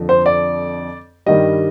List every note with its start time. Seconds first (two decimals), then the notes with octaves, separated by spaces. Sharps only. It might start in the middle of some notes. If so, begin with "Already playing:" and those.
Already playing: F2 D3 F3
0.09 C5
0.26 D5
1.26 G2 D#3 G3 D#5